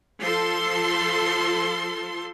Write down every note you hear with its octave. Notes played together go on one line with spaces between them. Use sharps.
F3 A4 C6